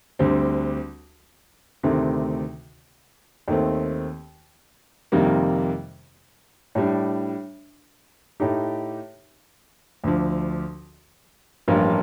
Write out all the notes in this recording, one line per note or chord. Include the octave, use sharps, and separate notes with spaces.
D2 D3 G3 C4
D2 C3 D#3 A3 C4
D#2 D#3 A3 C4
F2 C3 D#3 G3 A#3
A2 G3 D4
A2 A3 D#4 G4
D2 D3 F3
A1 G2 F3 A#3 F4